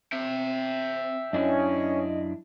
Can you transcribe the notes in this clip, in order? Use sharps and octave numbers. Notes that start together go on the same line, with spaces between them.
C4 E5 G5
F#2 C#4 D4 E4 D#5